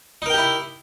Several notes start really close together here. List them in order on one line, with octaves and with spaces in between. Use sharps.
D#4 A#4 G5 G4 E4